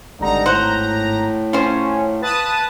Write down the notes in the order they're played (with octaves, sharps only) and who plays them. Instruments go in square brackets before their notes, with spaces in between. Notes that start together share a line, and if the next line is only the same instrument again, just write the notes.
[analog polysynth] G#1 A#5 [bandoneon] D3 G3 D#4
[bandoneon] A2 [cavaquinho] C5 F#5
[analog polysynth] C#4 [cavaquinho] F4 C5
[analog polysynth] B4 A5 D#6